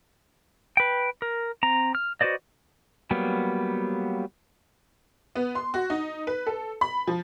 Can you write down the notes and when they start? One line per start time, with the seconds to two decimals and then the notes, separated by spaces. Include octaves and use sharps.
0.77 B4 G5
1.22 A#4
1.63 C4 A#5
1.95 F6
2.21 F#4 B4 C5 D5 D#5
3.11 F#3 G3 A#3 B3
5.36 B3
5.55 C6
5.74 F#4
5.90 D#4
6.27 B4
6.47 A4
6.81 B5
7.07 F3